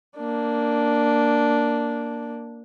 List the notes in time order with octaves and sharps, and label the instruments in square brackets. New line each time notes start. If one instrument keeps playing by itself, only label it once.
[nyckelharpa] A#3 D4